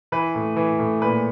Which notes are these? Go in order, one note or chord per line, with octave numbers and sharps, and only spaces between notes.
E3 B4
A2
E3
A2
A#2 B4